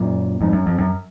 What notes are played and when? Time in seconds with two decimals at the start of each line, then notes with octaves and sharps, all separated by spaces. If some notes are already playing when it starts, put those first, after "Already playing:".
Already playing: F#2 A#2
0.41 F2 G#2
0.53 F#2
0.66 F2
0.78 F#2